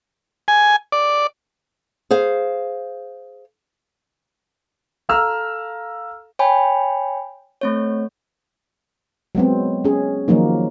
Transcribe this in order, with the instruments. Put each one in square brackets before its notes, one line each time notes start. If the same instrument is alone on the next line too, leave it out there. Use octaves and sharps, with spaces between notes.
[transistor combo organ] G#5
D5
[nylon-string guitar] G#4 C5 F5
[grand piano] A4 F5 A#5 E6 F6
[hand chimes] C#5 G5 G#5 B5
A3 C4 C#5
[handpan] F#3 G#3 B3 C4
C#4 G#4
D#3 F3 F#3 A#3 D#4